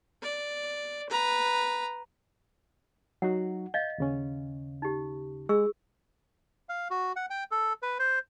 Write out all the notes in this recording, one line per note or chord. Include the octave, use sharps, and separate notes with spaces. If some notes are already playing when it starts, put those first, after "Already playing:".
D5
B4 A#5
F#3 D#4 F#4 F#5
D#5 F5 G6
D#2 C#3 C#4
D#4 G4
G#3 G#4 C#6 E6
F5
F#4
F#5
G5
A4
B4
C5